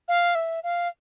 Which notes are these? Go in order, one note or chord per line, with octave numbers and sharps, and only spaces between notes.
F5
E5
F5